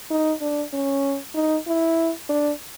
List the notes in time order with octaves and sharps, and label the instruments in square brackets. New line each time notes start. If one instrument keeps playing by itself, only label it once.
[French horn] D#4
D4
C#4
D#4
E4
D4